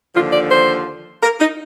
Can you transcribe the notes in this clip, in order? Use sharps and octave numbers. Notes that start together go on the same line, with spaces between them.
D#2 D3 F3 F4
D5
C5
A#4
D#4